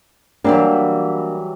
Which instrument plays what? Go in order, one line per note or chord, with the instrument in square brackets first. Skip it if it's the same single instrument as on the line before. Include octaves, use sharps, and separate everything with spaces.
[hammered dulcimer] E3 F#3 G3 [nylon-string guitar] A#3 D4